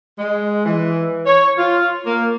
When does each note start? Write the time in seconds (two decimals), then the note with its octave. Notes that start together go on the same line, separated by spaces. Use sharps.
0.19 G#3
0.66 E3
1.26 C#5
1.57 F4
2.05 A#3